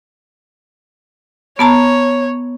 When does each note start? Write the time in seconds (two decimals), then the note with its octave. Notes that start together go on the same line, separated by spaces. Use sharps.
1.59 B3 C#5 A5 A#5